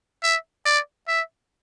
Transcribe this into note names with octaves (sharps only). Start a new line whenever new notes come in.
E5
D5
E5